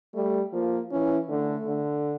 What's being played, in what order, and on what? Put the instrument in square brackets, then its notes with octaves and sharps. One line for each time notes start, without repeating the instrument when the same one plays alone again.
[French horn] G3 [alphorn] A3
[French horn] F3 [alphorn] A#3
[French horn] E3 [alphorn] C#4
[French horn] D3 [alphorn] A3
[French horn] D3